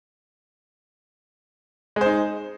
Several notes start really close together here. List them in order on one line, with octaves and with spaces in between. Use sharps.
G#3 C5 D#4